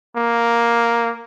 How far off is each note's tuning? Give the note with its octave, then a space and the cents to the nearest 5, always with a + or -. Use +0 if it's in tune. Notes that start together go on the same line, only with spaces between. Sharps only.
A#3 +5